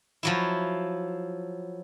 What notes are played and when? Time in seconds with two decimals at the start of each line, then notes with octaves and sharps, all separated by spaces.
0.23 F3 F#3 E4